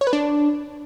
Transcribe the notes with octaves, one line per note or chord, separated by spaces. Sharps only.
C#5
B4
D4